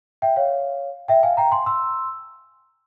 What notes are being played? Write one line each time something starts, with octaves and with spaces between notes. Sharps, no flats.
E5 G5
C#5 F5
E5 G5
F5 G#5
G5 A#5
G#5 C6
C6 E6